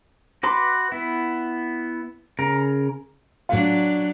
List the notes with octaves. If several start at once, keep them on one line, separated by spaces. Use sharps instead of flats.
F#4 B4 B5 C6 D6
B3 E4
C#3 A#4
A2 F#3 D4 F4